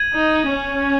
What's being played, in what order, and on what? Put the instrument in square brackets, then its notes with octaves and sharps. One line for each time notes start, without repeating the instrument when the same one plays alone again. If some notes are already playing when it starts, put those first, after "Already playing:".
Already playing: [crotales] G#6 D#7 F#7
[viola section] D#4
C#4